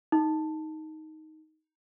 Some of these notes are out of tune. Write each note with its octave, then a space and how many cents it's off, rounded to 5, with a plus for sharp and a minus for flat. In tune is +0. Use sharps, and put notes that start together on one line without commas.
D#4 +10